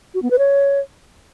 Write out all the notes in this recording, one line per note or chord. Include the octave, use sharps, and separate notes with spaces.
F#4
B3
B4
C#5